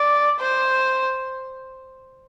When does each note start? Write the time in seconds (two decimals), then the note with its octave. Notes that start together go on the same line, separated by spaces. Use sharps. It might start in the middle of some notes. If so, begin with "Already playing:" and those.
Already playing: D5
0.40 C5